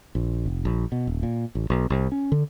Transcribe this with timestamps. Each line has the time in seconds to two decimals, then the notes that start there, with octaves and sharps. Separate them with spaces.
0.15 A#1
0.46 F1
0.65 A#1
0.92 B2
1.07 D#1
1.23 A#2
1.55 A1
1.70 B1
1.90 C2
2.12 C#4
2.32 D3